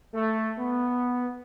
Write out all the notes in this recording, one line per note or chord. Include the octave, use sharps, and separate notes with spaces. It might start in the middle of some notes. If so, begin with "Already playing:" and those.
A3
B3